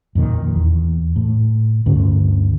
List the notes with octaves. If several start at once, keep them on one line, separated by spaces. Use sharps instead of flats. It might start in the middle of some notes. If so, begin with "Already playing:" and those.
F2 A#2 D#3
E2
A2
D2 G2 D3 C#4